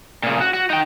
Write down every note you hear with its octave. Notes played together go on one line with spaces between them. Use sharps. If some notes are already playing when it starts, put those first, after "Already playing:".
A#2 C#3
F#4
F#4
D#4 G5